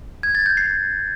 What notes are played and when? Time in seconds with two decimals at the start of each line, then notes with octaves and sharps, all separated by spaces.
0.23 G#6
0.35 A6
0.46 G6
0.57 C7